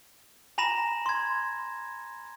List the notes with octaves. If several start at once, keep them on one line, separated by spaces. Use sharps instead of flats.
G#5 A#5 B5 A#6 E7
C6 G#6